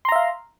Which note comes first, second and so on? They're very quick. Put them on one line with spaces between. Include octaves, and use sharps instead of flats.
C6 A#5 E5 F5